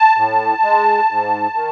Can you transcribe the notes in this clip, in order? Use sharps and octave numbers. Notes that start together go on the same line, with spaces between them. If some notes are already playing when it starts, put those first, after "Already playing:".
Already playing: A5
A2
G#3
G#2
D#3